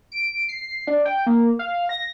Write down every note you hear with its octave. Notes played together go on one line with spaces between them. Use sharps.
D7
C7
D4
G5
A#3
F5
A#6